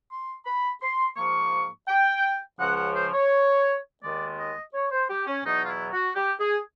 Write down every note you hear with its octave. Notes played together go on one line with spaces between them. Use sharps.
C6
B5
C6
G#2 F3 A#3 C#6
G5
C#2 C#3 F3 F#5
F#5
C5
C#5
D#2 D#3 G#3 B3 D5
D#5
C#5
C5
G4
C#4
E2 B2 F#3 B3 D#4
F4
E4
F#4
G4
G#4